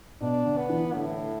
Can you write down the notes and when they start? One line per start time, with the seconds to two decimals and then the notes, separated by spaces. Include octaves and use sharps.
0.21 B2 D4
0.45 D3
0.57 B3
0.69 E3
0.94 A2 D3